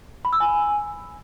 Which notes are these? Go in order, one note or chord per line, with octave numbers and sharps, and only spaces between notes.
B5
E6
G#5